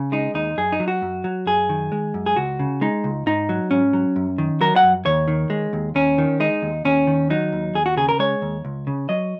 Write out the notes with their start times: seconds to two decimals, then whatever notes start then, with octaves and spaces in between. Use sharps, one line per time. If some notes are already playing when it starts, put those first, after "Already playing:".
Already playing: C#3
0.12 G#3 D#4
0.34 D#2 D#4
0.58 F#2 G#4
0.72 D#4
0.80 F#3
0.88 F#4
1.02 F#2
1.24 F#3
1.46 F#2 G#4
1.69 D#3
1.92 G#3
2.14 F#2
2.26 G#4
2.36 C#2 F#4
2.60 C#3
2.81 G#3 D#4
3.04 C#2
3.26 G#2 D#4
3.49 F#3
3.71 G#2 C#4
3.93 F#3
4.16 F#2
4.38 D#3
4.61 F#3 A#4
4.76 F#5
4.83 F#2
5.06 D#2 C#5
5.28 D#3
5.50 G#3
5.73 D#2
5.95 D#2 C#4
6.18 D#3
6.40 G#3 D#4
6.62 D#2
6.85 D#2 C#4
7.07 D#3
7.30 F#3 D#4
7.53 D#2
7.74 D#2 G#4
7.86 F#4
7.97 C#3 G#4
8.09 A#4
8.19 G#3 C#5
8.42 D#2
8.65 C#2
8.87 C#3
9.09 F#3 D#5